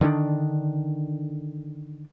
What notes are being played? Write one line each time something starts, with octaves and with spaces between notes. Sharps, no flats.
D3 D#3 G#3 D4